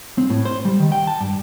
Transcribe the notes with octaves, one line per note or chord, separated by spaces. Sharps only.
C4
A2
C5
G3
D#3
G5
A5
G2